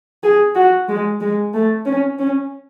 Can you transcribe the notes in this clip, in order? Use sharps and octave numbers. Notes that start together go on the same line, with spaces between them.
G#4
F#4
G#3
G#3
A3
C#4
C#4